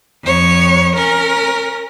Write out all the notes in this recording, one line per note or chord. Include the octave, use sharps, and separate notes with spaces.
F2 C#5
C#4 A#4